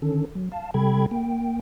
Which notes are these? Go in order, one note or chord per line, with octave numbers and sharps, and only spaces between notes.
D3 D#3 C#4 A4
F#3
F5 A5
C3 G3 A4 G5 B5 G#6
A#3 G5